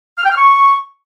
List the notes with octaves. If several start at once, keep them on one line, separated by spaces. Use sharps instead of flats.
F6
G5
F6
C#6